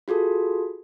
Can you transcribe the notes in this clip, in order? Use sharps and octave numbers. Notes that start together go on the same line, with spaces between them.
F4 F#4 G#4 A4